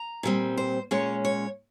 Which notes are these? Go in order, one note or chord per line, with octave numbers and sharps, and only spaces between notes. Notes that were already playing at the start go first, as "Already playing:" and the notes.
Already playing: A#5
A#2 G3 C4
C5
A#2 G#3 C#4 C#5
C#5